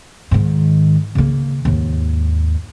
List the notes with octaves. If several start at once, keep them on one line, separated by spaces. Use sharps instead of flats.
G#2 D#3
C#3 A#3
D#2 G#2